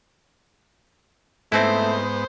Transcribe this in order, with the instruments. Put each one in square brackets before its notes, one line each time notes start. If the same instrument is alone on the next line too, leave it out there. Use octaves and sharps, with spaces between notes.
[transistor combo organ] G#2 B3 [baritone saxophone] A3 [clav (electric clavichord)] C4 D#4 E4 [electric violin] C5